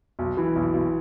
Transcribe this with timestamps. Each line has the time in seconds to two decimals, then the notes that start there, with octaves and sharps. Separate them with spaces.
0.19 B1
0.37 E3
0.56 B1
0.73 B1